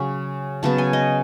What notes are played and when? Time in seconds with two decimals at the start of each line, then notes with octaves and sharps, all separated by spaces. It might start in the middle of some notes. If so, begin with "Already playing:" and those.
Already playing: C#3 F#3 C#4
0.63 C#3 F#3 B3 A5
0.78 G#5
0.93 D#5